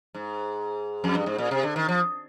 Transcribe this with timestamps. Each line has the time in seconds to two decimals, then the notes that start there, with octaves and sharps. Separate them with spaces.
0.15 G#2
1.04 F2
1.15 G2
1.26 G#2
1.38 A#2
1.51 C3
1.63 D3
1.76 D#3
1.89 F3